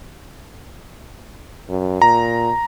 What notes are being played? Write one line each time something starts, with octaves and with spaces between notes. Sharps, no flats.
F#2
A#2 A#5